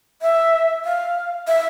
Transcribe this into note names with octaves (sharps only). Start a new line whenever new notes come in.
E5
F5
E5